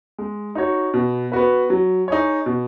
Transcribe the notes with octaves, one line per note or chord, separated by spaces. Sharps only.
G#3
D#4 F#4 C#5
B2
B3 F#4 B4
F#3
D#4 G#4 C#5
B2